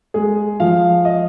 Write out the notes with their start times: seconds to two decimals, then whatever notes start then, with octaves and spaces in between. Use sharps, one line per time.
0.14 G#3 G#4
0.60 F3 F5
1.05 D#5